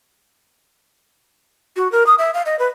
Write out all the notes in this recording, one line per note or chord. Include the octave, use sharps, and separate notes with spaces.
F#4
A#4
D#6
E5
F5
D#5
B4